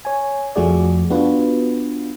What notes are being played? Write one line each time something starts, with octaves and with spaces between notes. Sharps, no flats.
C#5 G#5
F2 F3 A3 F#4 G#4 D5
B3 D4 F4 F#4 B4